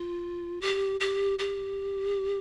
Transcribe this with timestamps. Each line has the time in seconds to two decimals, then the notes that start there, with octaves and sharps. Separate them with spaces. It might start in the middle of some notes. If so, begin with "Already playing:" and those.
Already playing: F4
0.61 G4
1.00 G4
1.39 G4